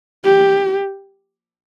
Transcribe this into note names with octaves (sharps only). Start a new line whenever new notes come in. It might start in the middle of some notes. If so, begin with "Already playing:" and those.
G4